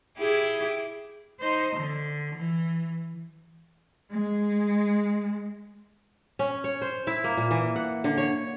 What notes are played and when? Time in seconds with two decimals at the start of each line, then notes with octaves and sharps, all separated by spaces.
0.18 E4 G4 G#4
1.40 D#4 C5
1.76 D3
2.35 E3
4.12 G#3
6.39 C#4
6.64 C#5
6.82 C5
7.07 E4
7.24 A#3
7.37 A#2
7.51 E3
7.76 F#5
8.04 D3
8.18 C#5